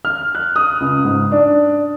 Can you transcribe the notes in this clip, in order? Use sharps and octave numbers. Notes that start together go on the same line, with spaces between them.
F6
F#6
D#6
C#2
G#2
D4